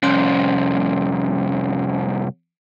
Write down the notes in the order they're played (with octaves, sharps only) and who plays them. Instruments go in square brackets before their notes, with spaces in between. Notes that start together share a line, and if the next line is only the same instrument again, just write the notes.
[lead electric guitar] C2 F2 [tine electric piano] C#4 C6